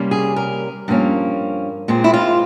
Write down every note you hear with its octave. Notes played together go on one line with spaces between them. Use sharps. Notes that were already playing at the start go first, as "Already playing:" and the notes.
Already playing: C3 G3 A#3 C#4
G#4
A#4
G2 F3 A#3 C#4
A#2 G#3 C4
E4
F4